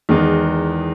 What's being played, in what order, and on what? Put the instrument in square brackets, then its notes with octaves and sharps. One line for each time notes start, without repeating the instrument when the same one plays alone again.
[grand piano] E2 D#3 G#3 B3 D#4